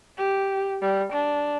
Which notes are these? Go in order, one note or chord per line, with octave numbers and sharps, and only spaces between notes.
G4
G3
D4